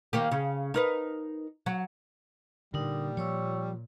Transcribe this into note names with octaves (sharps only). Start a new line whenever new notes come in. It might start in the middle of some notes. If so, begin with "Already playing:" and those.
D#3 A#3 G4
C#3
D#4 A#4 B4
F#3
A#2 D3 G3 D#4 A#4
F3 C#5 C#6 E6